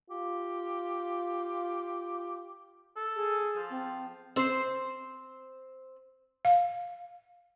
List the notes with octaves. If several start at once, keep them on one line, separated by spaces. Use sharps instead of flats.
F4 G4
A4
G#4
F3
C4
C4 C5
F5